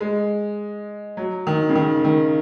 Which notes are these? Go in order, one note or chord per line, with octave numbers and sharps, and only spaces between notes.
G#3
F#3
D#3
C#3
D#3
D#3